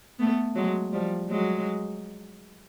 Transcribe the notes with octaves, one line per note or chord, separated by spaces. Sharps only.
A3 B3
F#3 G#3
F3 G3
F#3 G#3